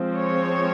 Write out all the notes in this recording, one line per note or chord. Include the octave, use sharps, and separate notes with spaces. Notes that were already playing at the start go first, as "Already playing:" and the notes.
Already playing: F3 G#3 C4
C#5